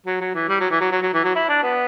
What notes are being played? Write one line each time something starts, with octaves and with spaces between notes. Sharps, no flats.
F#3
F#3
E3
G3
F#3
E3
F#3
F#3
F#3
E3
F#3
E4
D4
B3